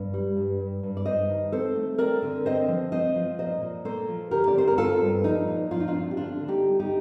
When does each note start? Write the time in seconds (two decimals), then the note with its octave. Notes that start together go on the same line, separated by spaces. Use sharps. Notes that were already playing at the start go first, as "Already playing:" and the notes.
Already playing: G2
0.14 G3
0.36 G2
0.60 G2
0.83 G2
0.97 D5
1.05 G2 C5 D#5
1.29 D#3
1.52 C4 A4 C5
1.76 A3
1.98 C4 A#4 D5
2.22 D3
2.46 C4 C5 D#5
2.68 F3
2.92 C4 C5 D#5
3.16 F3
3.39 A#2 C5 D#5
3.61 A#2
3.85 A#3 A4 C5
4.08 F3
4.31 D3 G4 A#4
4.47 D5
4.55 C4 C5
4.68 A#4
4.78 C4 F4 A4
5.01 G2
5.24 F3 D#4
5.48 A#2
5.71 F3 F4
5.80 D#4
5.88 D4 F4
5.94 C4
6.11 G4
6.17 D3 D4 F4
6.41 D3
6.48 D#4 G4
6.63 G3
6.80 D#4 G4